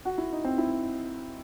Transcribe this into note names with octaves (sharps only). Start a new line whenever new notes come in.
F#4
E4
D#4
C4
E4